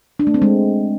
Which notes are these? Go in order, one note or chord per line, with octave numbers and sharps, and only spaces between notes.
D4
A3
C4
G#3